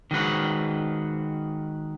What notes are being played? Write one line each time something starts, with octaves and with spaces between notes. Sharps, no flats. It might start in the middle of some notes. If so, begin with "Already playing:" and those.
D#3 G#3 F#4 B4